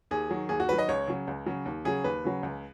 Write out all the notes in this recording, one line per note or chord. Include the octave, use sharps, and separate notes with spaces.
D#2 G#4
D#3 F#3
D#2 G#4
F#4
D#3 F#3 B4
D#5
C#2 C#5
C#3 F#3
C#2
C#3 F#3
D#2
C#3 F#3 G#4
D#2 B4
C#3 F#3
C#2